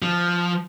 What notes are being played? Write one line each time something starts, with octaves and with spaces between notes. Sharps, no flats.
F3